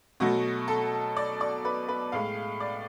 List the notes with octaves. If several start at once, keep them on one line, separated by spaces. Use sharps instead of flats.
B2 F#3 A3 F#4
A4
D5
D5
B4
B4
A2 G#3 F5
D5